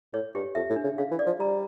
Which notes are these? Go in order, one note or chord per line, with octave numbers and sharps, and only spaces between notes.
A2 C#5
G2 G4
F2 E5
A2
D4
C#3
C#3 F5
E3
D5
F3
G3 A#5